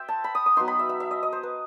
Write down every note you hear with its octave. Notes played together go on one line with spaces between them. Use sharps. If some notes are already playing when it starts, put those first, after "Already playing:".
Already playing: C5 E5 G5
A5
B5
D#6
D#6
F#3 B3 D#4 C6
B5
E5
E5
E5
D#5
D#5
C5
B4